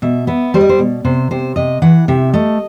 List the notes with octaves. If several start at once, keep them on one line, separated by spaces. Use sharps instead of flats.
B2 E5
B3 E5
G3 C5
D#5
C5
B2
C3 C5
C3 C5
C3 D#5
E3 F#5
C3 E5
A3 D#5